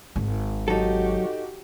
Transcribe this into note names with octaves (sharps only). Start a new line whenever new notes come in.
G#1
F#3 D#4 F#4 G4 A4